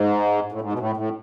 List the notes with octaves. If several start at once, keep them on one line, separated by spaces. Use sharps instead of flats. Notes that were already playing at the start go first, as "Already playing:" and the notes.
Already playing: G#2
A2
G#2
B2
A2
A2